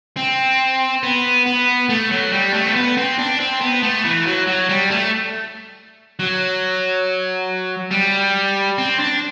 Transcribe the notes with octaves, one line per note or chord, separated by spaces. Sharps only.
C4
B3
B3
A3
F#3
G3
A3
C4
B3
C4
D4
C4
B3
A3
E3
F#3
F#3
G3
A3
F#3
G3
C4
D4